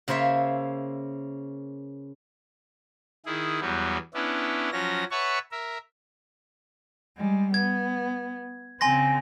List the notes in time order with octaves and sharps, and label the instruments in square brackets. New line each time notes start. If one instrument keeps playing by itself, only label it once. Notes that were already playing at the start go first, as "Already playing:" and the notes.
[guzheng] C#3 A#3 C5 C#5 E5
[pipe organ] D#3 E4 G#4
E2 F#3 G3 B3
B3 C#4 D4 E4
F3 F#3 C#4 A#6
B4 C#5 E5 F#5 A5 C#6
A#4 E5
[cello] G3 G#3
[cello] B3 [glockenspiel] G#6
[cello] C#3 C4 [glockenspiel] G#5 C6 A#6